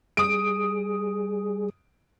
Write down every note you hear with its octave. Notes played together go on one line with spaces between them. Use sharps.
G3 G#4 D#6 D7